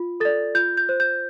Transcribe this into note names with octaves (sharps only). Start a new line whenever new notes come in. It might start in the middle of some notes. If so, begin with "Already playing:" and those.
Already playing: F4
A4 D5 A6
F4 G6
G6
C5
G6